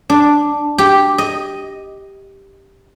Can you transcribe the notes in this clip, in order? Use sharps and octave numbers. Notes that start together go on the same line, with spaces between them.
D4
G4
D#5